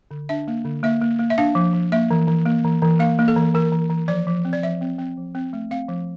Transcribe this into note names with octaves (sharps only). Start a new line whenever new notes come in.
D3
D4 E5
A#3
D3
A#3 E5
A#3
A#3
E5
D4 F5
F3
F3
A#3 E5
E3
E3
A#3
E3
E3
A#3 F5
A#3
A4
E3
E3 A#4
E3
E3
F3 D5
F3
C4
D5
F3 E5
C4
C4
F3
C4
A3
C4 F5
F3